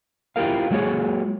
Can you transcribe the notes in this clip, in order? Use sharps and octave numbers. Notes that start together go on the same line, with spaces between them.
E4 F4 G4 G#4 A#4 F5
F#3 G#3 A#3 F#4 G#4 C#5